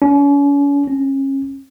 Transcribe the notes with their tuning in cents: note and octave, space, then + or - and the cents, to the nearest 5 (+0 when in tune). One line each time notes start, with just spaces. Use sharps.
C#4 +40
C#4 -30